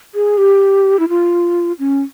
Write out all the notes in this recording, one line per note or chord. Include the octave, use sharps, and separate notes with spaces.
G#4
G4
E4
F4
C#4